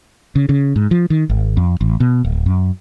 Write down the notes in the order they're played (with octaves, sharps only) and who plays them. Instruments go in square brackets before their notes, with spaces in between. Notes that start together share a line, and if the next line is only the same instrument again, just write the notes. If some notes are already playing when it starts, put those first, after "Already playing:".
[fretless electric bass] C#3
C#3
G#2
F3
D#3
G#1
F2
A1
B2
D1
F#2